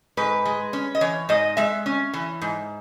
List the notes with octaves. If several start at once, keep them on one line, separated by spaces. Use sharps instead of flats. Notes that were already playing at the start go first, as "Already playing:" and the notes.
G#2 B4
G#3
C#4
D#5
E3 C#5
G#2 D#5
G#3 E5
C#4
E3
G#2